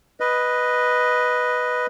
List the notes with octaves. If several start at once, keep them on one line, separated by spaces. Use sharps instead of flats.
B4 D#5